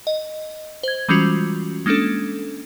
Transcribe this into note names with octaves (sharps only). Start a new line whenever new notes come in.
D#5
C5 G#6
E3 G3 G#3 C#4 F4 F#4
G#3 A#3 C#4 D4 A4